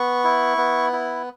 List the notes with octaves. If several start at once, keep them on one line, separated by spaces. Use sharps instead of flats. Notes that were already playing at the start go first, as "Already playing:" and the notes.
Already playing: B3 C#6
E4
B3
E4